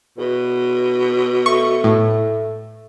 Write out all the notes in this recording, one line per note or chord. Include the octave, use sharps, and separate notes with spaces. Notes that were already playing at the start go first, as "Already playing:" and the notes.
E2 B2
A3 C#6
A2